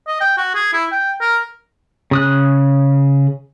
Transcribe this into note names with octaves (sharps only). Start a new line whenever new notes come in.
D#5
G5
F#4
G#4
E4
G5
A#4
C#3 D#6 F#6